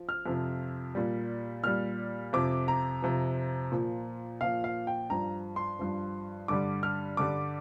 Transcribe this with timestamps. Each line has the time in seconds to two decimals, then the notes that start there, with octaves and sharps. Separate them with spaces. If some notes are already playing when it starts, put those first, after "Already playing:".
Already playing: F3
0.09 F6
0.26 F2 C3 F3
0.95 A#2 G3
1.64 A#2 G3 F6
2.33 F2 C3 F3 D6
2.68 A#5
3.02 F2 C3 F3
3.72 A#2 F3
4.41 A#2 F3 F5
4.64 F5
4.87 G5
5.10 G2 F3 A#5
5.56 C6
5.79 G2 F3
6.48 G2 D3 G3 D6
6.83 F6
7.17 G2 D3 G3 D6